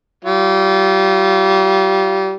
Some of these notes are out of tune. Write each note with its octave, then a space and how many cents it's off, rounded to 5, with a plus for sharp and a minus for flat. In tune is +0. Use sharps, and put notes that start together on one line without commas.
G3 -30 F4 -15